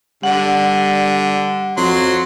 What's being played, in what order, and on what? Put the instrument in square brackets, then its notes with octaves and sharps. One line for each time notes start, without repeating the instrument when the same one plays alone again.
[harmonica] D3 [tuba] G3 [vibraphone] F#5
[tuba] F2 [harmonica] F#3 C6